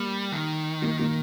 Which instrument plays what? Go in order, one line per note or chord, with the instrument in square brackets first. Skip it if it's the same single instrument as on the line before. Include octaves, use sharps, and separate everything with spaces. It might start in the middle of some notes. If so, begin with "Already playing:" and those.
Already playing: [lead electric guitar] G3 [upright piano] A#3
[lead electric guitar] D#3
[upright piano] A#3
A#3